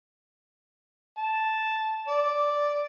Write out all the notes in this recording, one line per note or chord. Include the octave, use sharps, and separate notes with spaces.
A5
D5